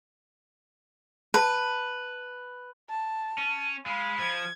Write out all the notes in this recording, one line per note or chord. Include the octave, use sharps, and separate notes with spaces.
B4 A5
A5
C#4
G#3 F5 B5
F3 G#6